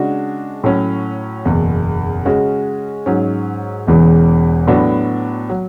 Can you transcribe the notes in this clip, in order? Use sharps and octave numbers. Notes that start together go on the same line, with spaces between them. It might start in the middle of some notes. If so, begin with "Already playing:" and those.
Already playing: C#3 G#3 D4 F#4
A2 F#3 C#4
F#1 E2 B2
C#3 G#3 C#4 F#4
G#2 F#3 C#4
E1 E2 C#3 E3
A2 F#3 B3 D4 F#4
F#3